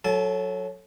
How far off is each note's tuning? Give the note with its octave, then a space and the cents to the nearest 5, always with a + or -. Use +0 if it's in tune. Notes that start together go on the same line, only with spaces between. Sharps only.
F#3 -10 A4 +0 A5 -45